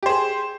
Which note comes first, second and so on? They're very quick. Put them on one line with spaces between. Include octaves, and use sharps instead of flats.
G4 C5 G#4